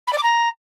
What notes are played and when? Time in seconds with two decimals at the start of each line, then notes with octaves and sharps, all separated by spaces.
0.07 B5
0.12 D5
0.17 D6
0.23 A#5